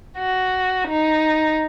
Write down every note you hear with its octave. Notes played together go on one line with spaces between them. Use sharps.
F#4
D#4